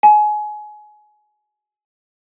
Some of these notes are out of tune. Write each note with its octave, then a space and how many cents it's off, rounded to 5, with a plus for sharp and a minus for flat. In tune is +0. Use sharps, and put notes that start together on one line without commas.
G#5 +25